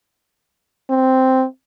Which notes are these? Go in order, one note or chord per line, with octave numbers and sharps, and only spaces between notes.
C4